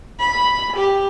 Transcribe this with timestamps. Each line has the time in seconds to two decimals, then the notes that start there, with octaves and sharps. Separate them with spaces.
0.20 B5
0.76 G4